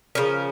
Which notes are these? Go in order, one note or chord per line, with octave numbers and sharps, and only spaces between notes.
C#3 F3 C#4 A#4